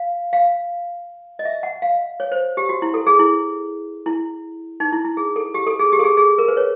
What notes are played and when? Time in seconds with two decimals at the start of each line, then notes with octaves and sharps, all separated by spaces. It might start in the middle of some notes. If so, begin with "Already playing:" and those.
Already playing: F5
0.33 F5
1.39 D#5
1.45 E5
1.63 F#5
1.82 F5
2.20 C#5
2.32 C5
2.57 G4
2.69 F#4
2.82 E4
2.94 A4
3.07 G#4
3.19 E4
4.06 E4
4.80 D#4
4.92 E4
5.05 E4
5.17 G#4
5.36 A4
5.54 G4
5.67 A4
5.79 G#4
5.92 G4
5.99 A4
6.04 G#4
6.17 G#4
6.38 A#4
6.48 B4
6.57 C#5